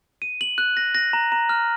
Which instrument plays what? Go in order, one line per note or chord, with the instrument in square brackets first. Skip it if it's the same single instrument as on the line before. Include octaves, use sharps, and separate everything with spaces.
[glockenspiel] D#7
F#7
F#6
A#6
A#6
A#5
A#5
F6